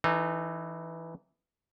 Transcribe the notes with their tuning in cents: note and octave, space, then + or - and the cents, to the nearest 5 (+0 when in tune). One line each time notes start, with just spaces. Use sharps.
E3 +0 D#4 -30 A4 +5